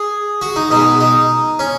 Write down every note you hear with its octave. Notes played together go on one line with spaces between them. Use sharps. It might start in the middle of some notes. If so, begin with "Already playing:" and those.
Already playing: G#4
F#4
D#4
B2 G#3 D#4
D#4
C#4